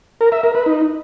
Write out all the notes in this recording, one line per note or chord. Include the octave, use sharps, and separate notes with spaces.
A#4
E5
A#4
B4
D#4